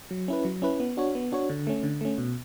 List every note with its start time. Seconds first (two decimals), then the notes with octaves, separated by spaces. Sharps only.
0.11 F#3
0.28 C#4 E4 B4
0.45 F#3
0.62 C#4 E4 B4
0.80 B3
0.97 D4 F#4 C#5
1.15 B3
1.32 D4 F#4 C#5
1.50 D3
1.67 A3 C#4
1.83 D3
2.01 A3 C#4
2.18 B2